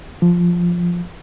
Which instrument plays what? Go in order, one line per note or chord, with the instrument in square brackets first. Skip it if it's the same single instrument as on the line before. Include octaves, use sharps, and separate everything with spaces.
[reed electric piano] F3